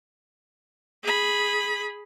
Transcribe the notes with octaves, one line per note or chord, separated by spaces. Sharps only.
G#4 B5